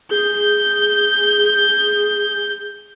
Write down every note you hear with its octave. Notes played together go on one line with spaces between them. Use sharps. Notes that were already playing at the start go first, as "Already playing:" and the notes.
G#4 G6